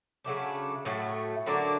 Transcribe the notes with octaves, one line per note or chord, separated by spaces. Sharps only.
C#3 F#3 A3 D4
A2 F#3 A3
D3 F#3 A#3 D4